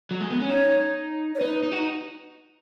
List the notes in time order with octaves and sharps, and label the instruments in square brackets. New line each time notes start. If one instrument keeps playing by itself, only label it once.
[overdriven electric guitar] F#3
G#3
B3
C#4
[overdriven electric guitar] D#4 [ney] C#5
[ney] C#5
[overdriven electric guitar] D#4 [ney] B4
[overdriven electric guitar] D#4
F#4
D#4